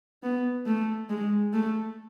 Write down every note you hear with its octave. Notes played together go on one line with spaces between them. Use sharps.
B3
A3
G#3
A3